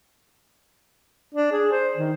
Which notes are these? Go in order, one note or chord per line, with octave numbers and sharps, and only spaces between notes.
D4
G#4
C5
D#3